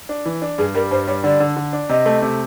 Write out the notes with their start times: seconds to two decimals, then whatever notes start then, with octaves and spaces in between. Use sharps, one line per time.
0.09 D4
0.26 E3
0.42 D4
0.58 G2 G#4
0.75 G3 A#4
0.91 G2 C5
1.07 G3 C#5
1.23 D3 D5
1.40 D3
1.57 D3
1.73 D4
1.89 C3 D#5
2.06 A3
2.22 C3